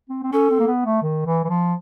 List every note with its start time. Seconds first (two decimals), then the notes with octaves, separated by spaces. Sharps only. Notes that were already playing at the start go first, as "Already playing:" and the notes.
0.10 C4
0.23 C4
0.32 C#4 A4
0.50 C4
0.60 A#3
0.67 B3
0.85 A3
1.03 D#3
1.26 E3
1.45 E3
1.49 F3